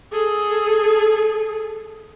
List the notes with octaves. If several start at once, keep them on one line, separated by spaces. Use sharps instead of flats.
G#4 A4